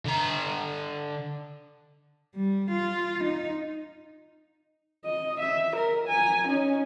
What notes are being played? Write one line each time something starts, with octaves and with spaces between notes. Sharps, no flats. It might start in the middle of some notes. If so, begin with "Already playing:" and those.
D3 A#5
G3
F4
D#4
D#5
E5
A#4
G#5 A#5
C#4 D#4